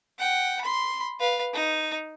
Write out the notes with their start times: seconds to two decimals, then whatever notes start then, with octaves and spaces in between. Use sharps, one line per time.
0.19 F#5 G5
0.61 B5 C6
1.20 B4 F5
1.54 D#4